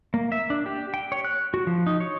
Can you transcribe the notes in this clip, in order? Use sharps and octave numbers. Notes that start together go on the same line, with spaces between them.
A#3
E5
D4
G4
G5
C#5
F#6
F#4
F3
D#4
C#5